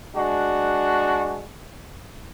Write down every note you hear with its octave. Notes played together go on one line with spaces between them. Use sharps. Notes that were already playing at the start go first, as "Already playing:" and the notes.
G#3 D4 F#4